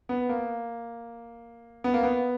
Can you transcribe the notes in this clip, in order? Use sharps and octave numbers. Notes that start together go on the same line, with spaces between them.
B3
A#3
B3
A#3
B3